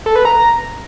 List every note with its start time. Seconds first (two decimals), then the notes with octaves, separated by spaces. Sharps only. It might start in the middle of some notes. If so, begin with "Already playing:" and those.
0.06 A4
0.16 B4
0.25 A#5